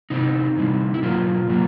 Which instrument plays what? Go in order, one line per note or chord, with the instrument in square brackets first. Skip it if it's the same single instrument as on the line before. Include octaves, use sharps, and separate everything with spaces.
[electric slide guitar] C3 E3 C4 D#4
C3 E3 G3 C4
E4
B2 F#3 A#3 F4
B2 F#3 A#3